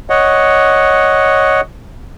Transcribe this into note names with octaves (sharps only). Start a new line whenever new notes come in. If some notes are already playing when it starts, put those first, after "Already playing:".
C#5 D#5 F#5